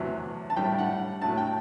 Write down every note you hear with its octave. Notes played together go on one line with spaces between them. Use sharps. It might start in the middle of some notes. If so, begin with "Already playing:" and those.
Already playing: E2 C3 F#3 A3
A5
A2 G3 G5
F#5
A2 F#3 A3 A5
G5